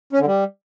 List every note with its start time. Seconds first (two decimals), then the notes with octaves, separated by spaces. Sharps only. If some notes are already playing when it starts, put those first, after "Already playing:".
0.13 C#4
0.20 D3
0.26 G3